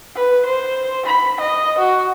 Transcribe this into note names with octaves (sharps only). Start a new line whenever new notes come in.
B4
C5
B5
D#5
F#4